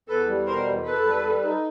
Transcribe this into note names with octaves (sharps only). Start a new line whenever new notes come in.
E2 A4 B4
G3
B2 A#4 C5
E2
E2 A4 B4
G3
G3
D#4